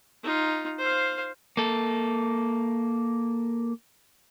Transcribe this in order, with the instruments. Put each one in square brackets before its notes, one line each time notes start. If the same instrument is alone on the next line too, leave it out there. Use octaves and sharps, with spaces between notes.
[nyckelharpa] D#4 F4
C5 F5
[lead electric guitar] A#3 A4